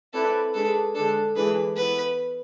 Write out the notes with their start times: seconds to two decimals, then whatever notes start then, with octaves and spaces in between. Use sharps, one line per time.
0.13 C4 E4 A4 B4 D5
0.54 G#3 D4 G#4 A4 B4
0.95 D3 G#3 D4 A4
1.35 E3 G#3 D4 G#4 B4
1.76 E3 B3 E4 B4